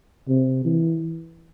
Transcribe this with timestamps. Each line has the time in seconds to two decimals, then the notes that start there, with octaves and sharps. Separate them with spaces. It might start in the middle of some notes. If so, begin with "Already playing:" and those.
0.28 C3
0.65 E3